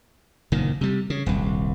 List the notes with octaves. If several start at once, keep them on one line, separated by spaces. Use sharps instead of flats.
F#1 A#2 D#3
C3 G3
C#3
D#1 C2